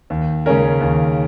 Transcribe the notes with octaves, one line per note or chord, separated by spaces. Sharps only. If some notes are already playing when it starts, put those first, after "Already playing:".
D#2
C#3 G#3 C#4 A#4
D#2